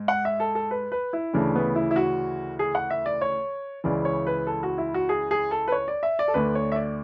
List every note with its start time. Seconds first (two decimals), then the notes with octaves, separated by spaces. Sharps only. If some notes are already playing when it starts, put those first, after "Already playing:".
Already playing: G#2
0.08 F#5
0.25 E5
0.40 A4
0.55 A4
0.71 B4
0.92 B4
1.13 E4
1.33 D2 C#3 E3 D4
1.55 B3
1.75 E4
1.91 E4
1.96 F#4
2.59 G#4
2.75 F#5
2.90 E5
3.06 D5
3.21 C#5
3.84 C#2 C#3 E3 D5
4.05 C#5
4.27 B4
4.47 A4
4.63 F#4
4.78 E4
4.94 F#4
5.09 G#4
5.31 G#4
5.51 A4
5.68 B4
5.72 C#5
5.88 D5
6.03 E5
6.19 D5
6.28 A4
6.34 D2 D3 B4
6.55 C#5
6.72 E5
6.76 D5